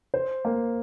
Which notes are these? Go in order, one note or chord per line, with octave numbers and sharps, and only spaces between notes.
C5
A#3